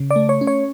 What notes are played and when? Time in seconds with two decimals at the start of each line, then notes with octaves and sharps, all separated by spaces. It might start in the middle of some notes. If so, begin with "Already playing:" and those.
Already playing: C#3
0.11 D5
0.16 A3
0.29 C#5
0.41 C#4
0.47 C#5